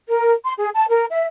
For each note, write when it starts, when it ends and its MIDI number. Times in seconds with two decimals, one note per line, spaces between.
0.08 0.32 70
0.43 0.53 84
0.58 0.69 68
0.74 0.84 81
0.89 1.05 70
1.11 1.25 76